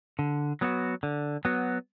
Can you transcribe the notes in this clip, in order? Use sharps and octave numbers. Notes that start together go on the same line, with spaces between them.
D3
F#3 B3 F#4
D3
F#3 B3 F#4